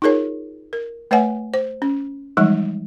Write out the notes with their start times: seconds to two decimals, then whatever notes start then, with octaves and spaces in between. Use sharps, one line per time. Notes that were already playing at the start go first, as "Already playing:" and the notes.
0.02 D#4 F4 G#4 A#4 C#5
0.73 A#4
1.11 A3 B4 C#5 E5 F#5 G#5
1.54 C5
1.82 C#4
2.37 E3 F3 G3 G#3 D#4